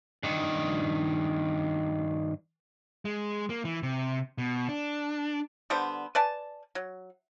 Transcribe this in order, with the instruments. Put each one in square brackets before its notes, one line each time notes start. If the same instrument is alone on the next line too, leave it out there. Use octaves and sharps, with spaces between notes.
[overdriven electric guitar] G2 D#3
[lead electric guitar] G#3
A#3
E3
C3
B2
D4
[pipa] D3 G3 B3 C5
B4 D5 G#5 A5
F#3